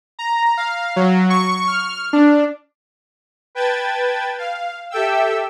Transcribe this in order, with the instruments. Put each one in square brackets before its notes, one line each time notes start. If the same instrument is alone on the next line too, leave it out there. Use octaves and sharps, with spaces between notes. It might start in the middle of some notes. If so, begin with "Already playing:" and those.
[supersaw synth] A#5
F5
F#3
C#6
F6
D4
B4 G5 A5 G#6 A6
F5
G4 A4 E5 G5 E6